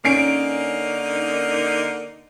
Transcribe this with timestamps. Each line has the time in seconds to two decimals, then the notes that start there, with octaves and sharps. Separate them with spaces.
0.05 D3 A#3 C#4 D#4 C7 D7